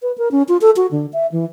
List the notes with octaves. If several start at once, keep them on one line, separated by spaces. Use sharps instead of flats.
B4
A#4
C#4
F4
A4
F#4
D3
E5
E3